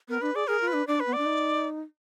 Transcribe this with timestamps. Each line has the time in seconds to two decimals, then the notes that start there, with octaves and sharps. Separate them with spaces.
0.08 B3 A#4
0.21 D4 B4
0.35 G#4 D5
0.48 G#4 A#4
0.61 F4
0.68 B4
0.73 D4
0.87 D4 D5
1.00 B4
1.07 B3
1.13 D4 D5
1.25 D#4